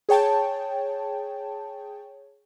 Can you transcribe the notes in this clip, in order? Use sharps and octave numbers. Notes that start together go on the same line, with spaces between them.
G#4 C#5 G5 A5